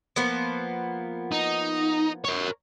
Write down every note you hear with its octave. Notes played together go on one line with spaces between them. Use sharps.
F3 A#3 B3
D#4
A#4 C#5